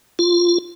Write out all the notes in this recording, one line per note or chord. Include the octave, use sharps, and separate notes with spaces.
F4